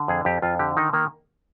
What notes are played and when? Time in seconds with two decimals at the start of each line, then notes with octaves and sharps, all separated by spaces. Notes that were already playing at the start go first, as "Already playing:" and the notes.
Already playing: D3
0.08 F2 G#4
0.25 F2 G4
0.42 F2 F4
0.59 D3 G4
0.77 D#3 D#4
0.93 D#3 A#3